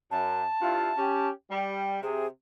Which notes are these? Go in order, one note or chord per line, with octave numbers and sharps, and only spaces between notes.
F#2 A5
G2 E4 F4
C#4 G4
G3
C3 G#4